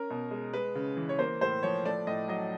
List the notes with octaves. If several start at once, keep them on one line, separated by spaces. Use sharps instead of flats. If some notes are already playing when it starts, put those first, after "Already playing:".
Already playing: C#4 A#4
B2
G#3
G#3 B4
C#3
E3
C#5
A#3 C5
A2 C5
F3 C#5
A3 D5
A2 D#5
F#3 D#5